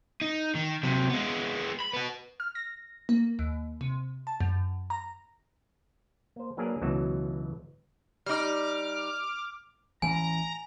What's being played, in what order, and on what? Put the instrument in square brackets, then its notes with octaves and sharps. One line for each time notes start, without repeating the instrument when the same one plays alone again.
[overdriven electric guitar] D#4
D#3
C3 F#3
G#3 B3
B5
B3 F#4
[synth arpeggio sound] F6
A#6
A#3
D#2
C3
A5
F#2
A#5
[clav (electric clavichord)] A#3 C5
F#3 A#3 D4 G#4 A#4 B4
C#2 B2 E3 F#3 F#4 A5
[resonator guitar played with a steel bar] G3 D#4 [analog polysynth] D6 F6
[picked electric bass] A1 E3 C#4 [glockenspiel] G#5 [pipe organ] A#5